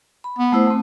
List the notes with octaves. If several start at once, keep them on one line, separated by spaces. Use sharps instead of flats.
B5
B3
A3 E4 C5
A3 C4